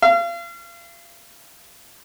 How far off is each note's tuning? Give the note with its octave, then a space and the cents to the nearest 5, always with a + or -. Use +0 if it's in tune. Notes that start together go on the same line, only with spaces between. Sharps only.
F5 -35